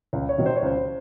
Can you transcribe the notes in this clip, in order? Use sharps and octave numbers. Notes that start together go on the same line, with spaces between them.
C#2
C#5
C3 D#3 F#3
C5
C#5
C#2 C5